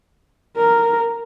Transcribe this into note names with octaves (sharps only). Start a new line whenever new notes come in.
A#4